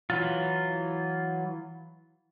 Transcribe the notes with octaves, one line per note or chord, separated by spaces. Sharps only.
E3 F#3 F4